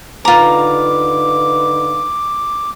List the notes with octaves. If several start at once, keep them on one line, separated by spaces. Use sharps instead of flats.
D3 D#4 F4 B4 A#5 D6